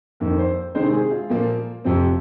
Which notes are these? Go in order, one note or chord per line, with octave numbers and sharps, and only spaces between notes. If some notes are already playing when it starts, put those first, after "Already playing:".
F2 D#3 A#3 A#4
C5
C3 D#3 G#3 C4 C5
G#4
F4
A#2 F3 A#3
F2 C3 F3 C4